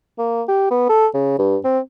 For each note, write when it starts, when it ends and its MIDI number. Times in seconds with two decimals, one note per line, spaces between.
0.18 0.43 58
0.48 0.69 67
0.71 0.89 59
0.89 1.07 69
1.14 1.38 49
1.39 1.57 43
1.65 1.79 60